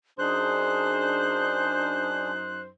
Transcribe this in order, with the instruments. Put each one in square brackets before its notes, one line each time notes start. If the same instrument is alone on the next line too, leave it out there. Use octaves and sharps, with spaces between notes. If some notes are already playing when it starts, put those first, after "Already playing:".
[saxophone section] F#2 D#4 C5 [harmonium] D4 G#4 [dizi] F#6